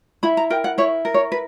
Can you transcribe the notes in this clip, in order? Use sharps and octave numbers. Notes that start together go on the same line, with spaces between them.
E4 B5
A#5
A#4 G5
F#5
E4 C#5
A#4
C#5
B4